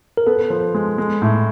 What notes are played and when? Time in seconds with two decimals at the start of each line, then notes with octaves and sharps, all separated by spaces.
0.17 A#4
0.26 B3 A4
0.50 F3
0.74 G#3
0.98 G#3
1.22 A2